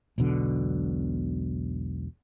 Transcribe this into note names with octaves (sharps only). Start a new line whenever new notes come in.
E1 B1 B2 D3